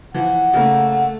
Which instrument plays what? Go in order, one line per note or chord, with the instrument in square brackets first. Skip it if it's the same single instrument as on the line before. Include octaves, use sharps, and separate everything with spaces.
[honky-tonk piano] E3 F3 [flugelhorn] F#5
[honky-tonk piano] C#3 A#3 [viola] A3